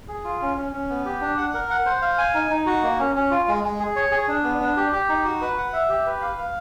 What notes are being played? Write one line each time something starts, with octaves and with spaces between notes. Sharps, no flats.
G#4
F4
C#4
C#4
C#4
B3
G4
D4
F#5
A#4
F#5
C5
F5
G#5
D#4
D#4
F#4
A#3
C#4
C#4
F4
G#3
G#3
G#4
C#5
G#4
D4
B3
D4
G4
G4
D#4
F#4
B4
F#5
E5
G4
B4
F5
F5